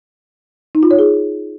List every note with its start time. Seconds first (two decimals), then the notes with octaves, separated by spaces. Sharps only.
0.75 D#4
0.83 F4
0.91 C#5
0.99 G#4